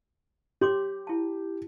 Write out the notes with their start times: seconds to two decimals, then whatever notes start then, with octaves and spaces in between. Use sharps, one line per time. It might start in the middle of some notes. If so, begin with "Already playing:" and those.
0.61 G4 C#5 C6 D6
1.07 E4 A5